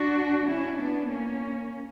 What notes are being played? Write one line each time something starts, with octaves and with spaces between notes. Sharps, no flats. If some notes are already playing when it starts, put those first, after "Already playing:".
Already playing: D4 F#4
C#4 E4
B3 D4
A#3 C#4